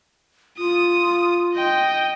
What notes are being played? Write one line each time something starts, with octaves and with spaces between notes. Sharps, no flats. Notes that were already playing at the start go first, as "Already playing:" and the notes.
F4 D#6
D#5 G5